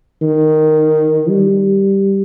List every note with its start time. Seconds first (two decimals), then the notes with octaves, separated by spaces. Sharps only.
0.22 D#3
1.29 G3